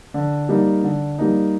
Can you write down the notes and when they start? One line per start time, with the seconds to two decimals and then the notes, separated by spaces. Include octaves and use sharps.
0.14 D3
0.49 G3 A#3 D#4
0.84 D3
1.19 G3 A#3 D#4